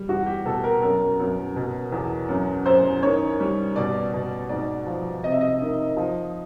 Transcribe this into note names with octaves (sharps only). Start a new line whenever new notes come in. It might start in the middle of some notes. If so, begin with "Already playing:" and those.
Already playing: G3
E2 F#4
G4
B2 A4
A#4
F#2 A#4
F#2
B2
E2
F#2
F#2 C5
D#3 C#5
G3
B2 D5
B2
G#2 D5
F3
C3 D#5
E5
D#5
D#3
F3